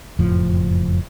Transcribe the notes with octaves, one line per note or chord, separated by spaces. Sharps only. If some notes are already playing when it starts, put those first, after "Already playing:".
F#1 F2 A2 F3